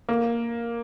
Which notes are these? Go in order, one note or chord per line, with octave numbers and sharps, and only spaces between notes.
A#3